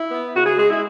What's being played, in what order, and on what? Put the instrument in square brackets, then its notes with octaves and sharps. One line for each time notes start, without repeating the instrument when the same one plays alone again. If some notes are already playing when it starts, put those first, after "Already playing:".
Already playing: [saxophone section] E4
B3
C#3 F#4
G#4
G#3 G#4
E4